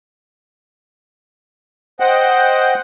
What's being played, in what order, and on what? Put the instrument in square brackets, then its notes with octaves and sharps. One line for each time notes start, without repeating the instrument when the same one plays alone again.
[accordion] C5 D#5 F#5 G5